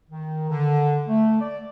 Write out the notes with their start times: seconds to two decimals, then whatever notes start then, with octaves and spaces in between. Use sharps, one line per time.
0.10 D#3
0.50 D3
1.07 A3
1.41 D5